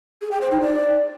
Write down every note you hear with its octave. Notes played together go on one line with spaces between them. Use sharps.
G#4
G5
C5
D#4
D5